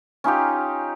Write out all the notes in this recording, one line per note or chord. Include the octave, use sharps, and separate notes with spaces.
C#4 D#4 F4 G4